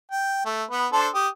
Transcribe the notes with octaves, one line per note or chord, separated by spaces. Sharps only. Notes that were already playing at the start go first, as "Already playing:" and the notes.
G5
A3
B3 B4
D4 A4 C5
G4 D#6